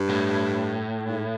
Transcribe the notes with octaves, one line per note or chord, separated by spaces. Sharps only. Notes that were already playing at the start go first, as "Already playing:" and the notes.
Already playing: G2
A2
G#2